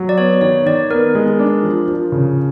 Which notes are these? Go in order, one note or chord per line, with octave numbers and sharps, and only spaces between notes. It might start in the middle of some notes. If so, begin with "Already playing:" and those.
Already playing: F#3
D5
B3 C#5
D#3 C#5
D#3 D5
B3 A#4
G#3
D4
F3
F3
C#3